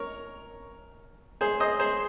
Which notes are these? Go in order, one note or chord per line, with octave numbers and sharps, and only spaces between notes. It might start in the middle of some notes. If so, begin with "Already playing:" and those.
Already playing: A#4 C#5
G#4 C5
C5 D#5
G#4 C5